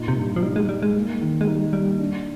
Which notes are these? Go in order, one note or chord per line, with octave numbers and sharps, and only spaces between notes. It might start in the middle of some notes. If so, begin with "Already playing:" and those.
Already playing: A#2 D#4
C3
G2
F3
G3 D#4
G#3
G3 D#4
G#3
A#3
D#3
G#3
G3 D#4
G3 A#3
D4